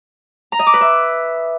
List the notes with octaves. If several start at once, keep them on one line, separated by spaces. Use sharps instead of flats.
A#5
D#5
D6
B4
E5